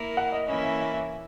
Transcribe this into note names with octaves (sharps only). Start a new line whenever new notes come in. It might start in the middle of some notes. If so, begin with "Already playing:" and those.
Already playing: A#3 E4 A#4
F#5
D#5
E3 A#3 C#4 E4 D#5
E5
E5
E5